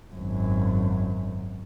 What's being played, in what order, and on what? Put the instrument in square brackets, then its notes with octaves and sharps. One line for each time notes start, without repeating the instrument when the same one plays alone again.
[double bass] G#1 F#2